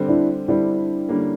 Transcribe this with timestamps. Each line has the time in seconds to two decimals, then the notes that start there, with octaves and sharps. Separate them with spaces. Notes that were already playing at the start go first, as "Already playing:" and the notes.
Already playing: D3 G3 C4
0.08 D4 E4
0.48 D3 G3 C4 D4 E4
1.09 D3 G3 A#3 C#4